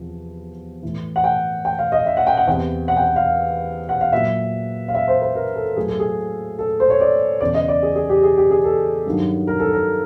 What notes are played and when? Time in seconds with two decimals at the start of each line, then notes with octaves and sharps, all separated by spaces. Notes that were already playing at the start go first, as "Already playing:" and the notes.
Already playing: E2 C3 F3
0.83 A2 E3
1.16 F#5
1.24 G5
1.65 G5
1.79 F5
1.92 D#5
2.06 E5
2.17 F#5
2.27 G5
2.37 F#5
2.47 E2 C3 E3 G5
2.88 F#5
2.96 G5
3.02 F#5
3.16 F5
3.89 F#5
4.01 F5
4.12 A#2 F#3 E5
4.88 F5
4.95 E5
5.08 C5
5.22 B4
5.35 A#4
5.56 A4
5.76 A2 F#3 G#4
5.89 A4
5.99 G#4
6.59 A4
6.80 C5
6.90 C#5
7.01 D5
7.41 E2 C#3 E3 D5
7.54 D#5
7.68 D5
7.83 G#4
7.96 G#4
8.10 G4
8.23 G#4
8.38 G4
8.51 G#4
8.65 A4
9.06 G2 D#3 F#3
9.47 A#4
9.60 A4
9.73 A#4